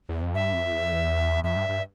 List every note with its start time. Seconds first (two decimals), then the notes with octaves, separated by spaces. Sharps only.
0.09 E2
0.22 F2
0.34 G2 E5
0.53 F2
0.72 E2
0.82 F2
0.92 E2
1.44 F2 E5
1.56 G2
1.69 G2